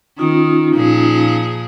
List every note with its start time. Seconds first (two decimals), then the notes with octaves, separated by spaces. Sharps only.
0.18 D#3 C#4 D#4 F4
0.74 A#2 F3 G#4